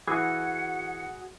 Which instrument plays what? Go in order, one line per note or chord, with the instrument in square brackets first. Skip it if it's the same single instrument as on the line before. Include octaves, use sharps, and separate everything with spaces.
[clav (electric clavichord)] E3 [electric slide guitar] F#4 G#4 [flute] F#5